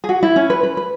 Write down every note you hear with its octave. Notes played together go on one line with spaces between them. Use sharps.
G#4
F#4
E4
C#4
B4
B4
B4